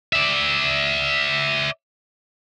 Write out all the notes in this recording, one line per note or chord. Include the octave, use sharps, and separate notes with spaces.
D5 E5